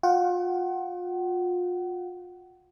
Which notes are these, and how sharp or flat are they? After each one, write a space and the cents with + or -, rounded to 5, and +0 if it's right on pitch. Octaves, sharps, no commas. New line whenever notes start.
F4 +35 F#5 +35